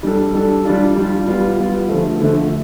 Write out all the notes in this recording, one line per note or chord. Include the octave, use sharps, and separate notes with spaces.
G3 D4 A4
G3 D4 A4
G3 D4 F4
G3 D4 F4
G3 B3 F4
G3 B3 F4
D3 F3 A3
D3 F3 A3